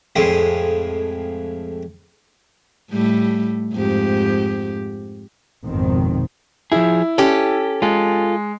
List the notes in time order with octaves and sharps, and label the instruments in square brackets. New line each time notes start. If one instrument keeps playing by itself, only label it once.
[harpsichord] F2 A2 G#3 D#5 G5 C6
[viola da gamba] A2 G3 A3
F2 G#2 G4
[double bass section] G#1 F2 B2 D#3 C4
[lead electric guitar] F3 G#4 [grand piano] E4
[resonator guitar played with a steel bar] C#4 G4 [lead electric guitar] A4
[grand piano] G#3 [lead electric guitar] F4 A4